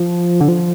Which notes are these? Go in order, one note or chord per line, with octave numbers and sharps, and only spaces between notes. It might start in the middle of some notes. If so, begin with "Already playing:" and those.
Already playing: F3
D3
F3